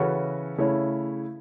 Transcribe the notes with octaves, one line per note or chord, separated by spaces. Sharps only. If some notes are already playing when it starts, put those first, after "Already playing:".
Already playing: C#3 E3 C#4 F#4 A4
C#3 A3 E4 C#5